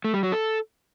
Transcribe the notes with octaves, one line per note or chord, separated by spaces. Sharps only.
A3
G3
F#3
A4